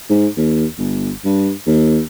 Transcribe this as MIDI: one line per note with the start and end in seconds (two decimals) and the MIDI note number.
0.09 0.27 44
0.37 0.65 39
0.78 1.11 31
1.24 1.50 43
1.67 2.00 39